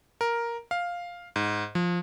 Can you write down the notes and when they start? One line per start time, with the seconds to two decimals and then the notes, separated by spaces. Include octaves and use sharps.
0.21 A#4
0.71 F5
1.36 G#2
1.75 F3